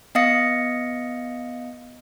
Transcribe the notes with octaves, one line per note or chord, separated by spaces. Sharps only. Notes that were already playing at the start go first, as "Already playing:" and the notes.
B3 D#5 F5 D#6 A#6 C#7